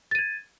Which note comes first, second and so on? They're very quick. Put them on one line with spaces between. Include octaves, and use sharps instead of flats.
A6 D#7 G#6